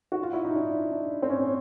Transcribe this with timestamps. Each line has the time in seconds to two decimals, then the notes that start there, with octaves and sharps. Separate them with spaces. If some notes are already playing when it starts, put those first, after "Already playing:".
0.12 F#4
0.23 F4
0.33 E4
0.45 D#4
0.55 D4
0.92 D4
1.22 C4
1.29 C#4